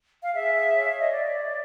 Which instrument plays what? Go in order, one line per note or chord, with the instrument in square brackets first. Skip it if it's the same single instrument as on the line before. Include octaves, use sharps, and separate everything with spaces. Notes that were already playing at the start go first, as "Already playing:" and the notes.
[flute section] F5
G#4 E5
C#5 F5
E5
D#5
C#5 D5